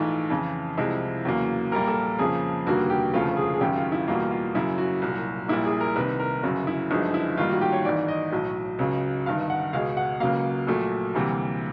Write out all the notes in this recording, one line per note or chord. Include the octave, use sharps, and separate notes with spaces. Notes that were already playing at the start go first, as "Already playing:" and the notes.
Already playing: A#1 G#2 E3 A3 F4
F2 C#3 E3
C2 C3 F3 G#3 E4
E2 C#3 F#3 A#3
A#1 A#2 G3 A#3 A#4
A4
F2 C#3 F3 A#3 G#4
F1 D#2 D3 G3 A#3 F#4
G4
E1 D2 C#3 F3 A3 F4
G#4
G#4
G#1 F#2 C#3 G4
F4
E4
E2 B2 G3 A#3 F4
F4
F#2 C#3 F#3 E4
F#4
C2 A#2 F#3
A#1 A#2 G3 A#3 E4
G#4
A#4
C2 C3 D#3 B4
A#4
G1 F#2 C#3 F#4
E4
G1 F#2 D3 F3 G#3 D#4
E4
A1 G#2 D#3 G3 A#3 F4
F#4
G4
C#5
G#1 G#2 E3 D5
D#5
B1 A2 F#3
C#2 C#3 F#3
G1 G2 D#3 F5
F#5
C#2 B2 G#3 F5
F#5
C#2 C#3 F#3 A#3 F5
A#1 A#2 F#3 A3
D2 C3 E3 G3 A#3